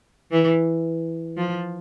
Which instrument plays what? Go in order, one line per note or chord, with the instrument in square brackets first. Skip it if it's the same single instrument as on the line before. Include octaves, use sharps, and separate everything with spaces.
[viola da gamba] E3
F3